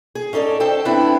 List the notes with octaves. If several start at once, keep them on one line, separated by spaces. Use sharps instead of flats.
G#4
C#4 D#4 A4 D5
A4 C5 G5 A5
B3 C4 D4 E4